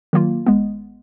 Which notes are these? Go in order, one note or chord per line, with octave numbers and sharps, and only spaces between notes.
D#3 F#3 A#3 F4
G#1 G#3 B3